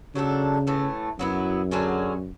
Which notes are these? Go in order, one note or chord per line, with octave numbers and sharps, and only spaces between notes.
C#3 F#3 A3 D4 A4
A2 E3 A3
F#2 F#3 B3 E4
D3 F#3 C#4 G#4